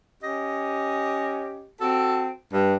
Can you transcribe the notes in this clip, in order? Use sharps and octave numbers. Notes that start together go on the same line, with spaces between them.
C#4 G4 D#5
C4 F#4 A4
G2